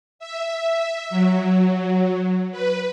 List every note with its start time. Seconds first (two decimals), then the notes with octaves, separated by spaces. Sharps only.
0.19 E5
1.10 F#3
2.52 B4